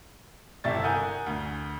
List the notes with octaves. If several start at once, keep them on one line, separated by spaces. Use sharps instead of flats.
G1 C3 E4 G4 C#6 A6
A#4 F#5 G#5 D#6 G6
D2